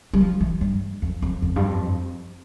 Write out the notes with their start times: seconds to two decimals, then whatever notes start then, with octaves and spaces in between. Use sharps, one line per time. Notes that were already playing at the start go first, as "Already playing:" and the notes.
0.13 G3
0.20 F3
0.41 E3
0.61 G2
1.02 F2
1.22 F2
1.42 F2
1.56 G2
1.68 F2